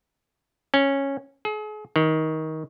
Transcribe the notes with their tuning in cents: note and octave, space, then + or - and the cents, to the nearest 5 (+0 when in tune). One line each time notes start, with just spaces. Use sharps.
C#4 -10
G#4 +40
D#3 +20